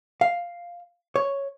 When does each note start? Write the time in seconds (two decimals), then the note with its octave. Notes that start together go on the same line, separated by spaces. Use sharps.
0.21 F5
1.16 C#5